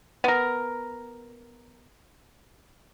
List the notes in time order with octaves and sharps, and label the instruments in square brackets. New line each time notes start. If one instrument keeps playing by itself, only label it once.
[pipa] B3 A#4